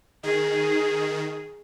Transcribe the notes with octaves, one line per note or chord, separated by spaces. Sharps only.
D#3 G#4